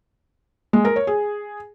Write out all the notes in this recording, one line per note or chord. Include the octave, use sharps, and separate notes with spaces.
G#3
A#4
C#5
G#4